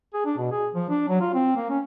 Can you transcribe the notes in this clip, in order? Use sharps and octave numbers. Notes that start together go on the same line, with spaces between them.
G#4
D4
B2
G#4
F3
D4
F#3
F4
C4
A#3
C#4